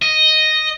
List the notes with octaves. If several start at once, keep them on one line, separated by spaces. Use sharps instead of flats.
D#5